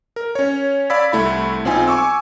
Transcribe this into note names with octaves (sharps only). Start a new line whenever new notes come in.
A#4
C#4 C#5
D5 F5 B5 E6 G#6 B6
C2 A3 E4 B5
B1 C4 D#4 F4 G#5
G#5 C#6 D6 E6